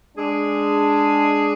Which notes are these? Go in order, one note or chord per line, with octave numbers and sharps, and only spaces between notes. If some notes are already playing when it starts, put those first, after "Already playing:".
G#3 D4 G#4